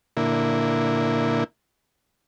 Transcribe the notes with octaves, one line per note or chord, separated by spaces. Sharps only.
A#2 D3 A#3 E4